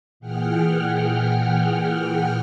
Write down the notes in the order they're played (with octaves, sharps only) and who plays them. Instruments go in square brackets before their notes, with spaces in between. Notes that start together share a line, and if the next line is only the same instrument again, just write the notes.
[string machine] A#2 E3 G#4 F#5 G5 F6